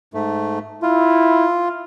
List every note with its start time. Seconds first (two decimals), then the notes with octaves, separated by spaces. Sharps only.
0.14 G#2 A3
0.82 E4 F4